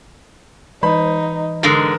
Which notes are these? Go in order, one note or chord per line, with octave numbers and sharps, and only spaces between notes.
E3 D#4 B4 B5
G#2 D3 G#3 A#4 A#6